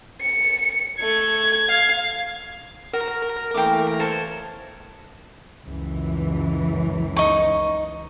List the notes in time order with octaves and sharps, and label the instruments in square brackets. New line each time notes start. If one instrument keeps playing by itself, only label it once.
[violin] C#7
[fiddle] A3 [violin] G#6
[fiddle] F5
[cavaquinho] F#4 [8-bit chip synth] A#4
[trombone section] E3 A3 A#3 [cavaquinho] G5 D6
[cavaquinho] A4 C5 C#5
[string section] C#2 F#2 E3
[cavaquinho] D#4 C#6